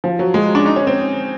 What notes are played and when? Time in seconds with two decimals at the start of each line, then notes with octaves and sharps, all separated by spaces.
0.04 F3
0.19 F#3
0.34 G#3
0.55 D4
0.66 D#4
0.76 C#4
0.87 C4